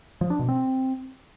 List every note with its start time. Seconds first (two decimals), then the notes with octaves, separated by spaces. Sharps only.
0.21 F3
0.30 D4
0.39 B2
0.49 C4